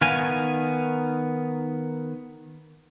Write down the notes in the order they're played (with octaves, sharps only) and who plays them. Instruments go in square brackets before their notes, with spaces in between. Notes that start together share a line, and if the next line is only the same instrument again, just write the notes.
[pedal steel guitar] D#3 B3 F5 G#5